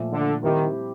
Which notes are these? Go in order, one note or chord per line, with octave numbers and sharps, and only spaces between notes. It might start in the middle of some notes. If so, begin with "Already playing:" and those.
Already playing: A#2 F3 A3
D3
D#3 G3 C4 E4 G4